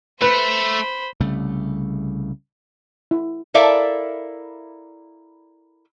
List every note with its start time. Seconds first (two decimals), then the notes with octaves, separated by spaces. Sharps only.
0.22 A3 B4 C5 B5
1.21 C2 C#3 G3 A3
3.11 E4
3.54 E4 A4 A#4 D5 E5 F5